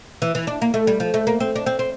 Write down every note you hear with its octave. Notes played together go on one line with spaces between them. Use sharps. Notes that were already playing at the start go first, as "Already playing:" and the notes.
E3
E3
D4
A#3
A3
G3
F3
A3
A#3
C4
D4
C4
C4